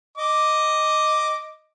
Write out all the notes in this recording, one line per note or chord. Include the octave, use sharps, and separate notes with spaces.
D#5 D6